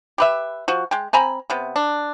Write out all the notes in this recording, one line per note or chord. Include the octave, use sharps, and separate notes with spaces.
G4 B4 E5
F3 F#4
G#3 G5
C4 G#5 A#5 B5
C3 B3
D4